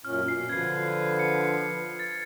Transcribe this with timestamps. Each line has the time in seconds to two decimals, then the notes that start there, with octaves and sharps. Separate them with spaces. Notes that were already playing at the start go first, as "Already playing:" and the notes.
0.05 F#2 A#2 C#4 F6
0.28 B2 C7
0.49 D3 F3 B4 G#6 C7
1.19 C#7
1.99 A6